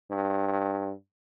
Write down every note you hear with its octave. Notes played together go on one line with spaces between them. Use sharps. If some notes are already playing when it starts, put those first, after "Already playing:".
G2